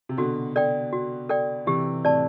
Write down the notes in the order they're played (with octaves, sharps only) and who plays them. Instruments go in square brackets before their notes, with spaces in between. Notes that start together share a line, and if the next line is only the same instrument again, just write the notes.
[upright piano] C3
[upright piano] B2 D3 [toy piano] F#4
[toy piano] A4 D5 G5
F#4
A4 D5 G5
[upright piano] C3 E3 [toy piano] G4
[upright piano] A2 C3 [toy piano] D5 A5